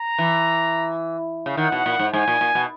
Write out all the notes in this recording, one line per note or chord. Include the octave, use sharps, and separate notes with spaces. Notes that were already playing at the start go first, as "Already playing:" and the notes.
Already playing: A#5
E3
C#3
D#3 F#5
B2
A#2
G#2
G#2 G#5
A#2
A#2
B2